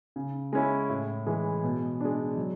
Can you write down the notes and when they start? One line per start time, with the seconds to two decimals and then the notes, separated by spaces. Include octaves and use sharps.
0.16 C#3
0.53 G#3 C#4 E4
0.90 A2
1.27 E3 G#3
1.64 B2
2.01 G#3 D4
2.37 F#3